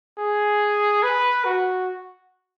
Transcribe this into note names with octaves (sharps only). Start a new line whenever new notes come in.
G#4
B4
F#4